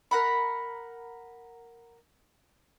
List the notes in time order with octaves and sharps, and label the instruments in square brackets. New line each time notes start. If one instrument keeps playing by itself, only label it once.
[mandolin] A#4 F#5 B5